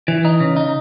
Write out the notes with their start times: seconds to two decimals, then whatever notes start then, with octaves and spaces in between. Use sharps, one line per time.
0.08 E3
0.25 D#4
0.40 C#3
0.56 D#4